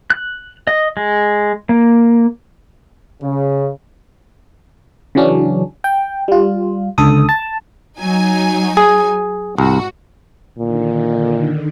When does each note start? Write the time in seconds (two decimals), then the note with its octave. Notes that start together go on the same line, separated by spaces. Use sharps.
0.10 F#6
0.67 D#5
0.97 G#3
1.69 A#3
3.22 C#3
5.15 C#3 E3 F#3 C#4 D4
5.84 G5
6.28 G3 F4
6.98 C#2 D3 A4 D#6
7.29 A5
7.99 F#3 D#4 G#5
8.77 G#4
9.58 C2 G#2 F#4
10.59 A#2 D3 D#3